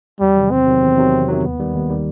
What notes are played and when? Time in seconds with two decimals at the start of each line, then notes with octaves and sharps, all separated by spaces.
0.20 E2 G3
0.36 C3 D#3 F#3
0.51 E2 C4
0.67 C3 D#3 F#3
0.82 E2
0.98 C3 D#3 F#3
1.13 E2
1.28 C3 D#3 F#3
1.43 D#2 B3
1.59 D#3 G3
1.74 D#2
1.90 D#3 G3